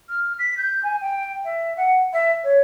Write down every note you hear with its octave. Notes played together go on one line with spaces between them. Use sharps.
F6
B6
G6
G#5
G5
E5
F#5
E5
C#5